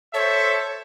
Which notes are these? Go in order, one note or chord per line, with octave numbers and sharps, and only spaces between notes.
A4 C5 C#5 E5